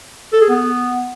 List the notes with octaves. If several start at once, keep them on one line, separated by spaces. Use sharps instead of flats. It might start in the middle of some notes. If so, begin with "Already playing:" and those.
A4
G#4
B3